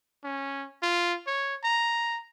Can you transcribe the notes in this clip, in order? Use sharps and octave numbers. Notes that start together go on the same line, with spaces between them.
C#4
F4
C#5
A#5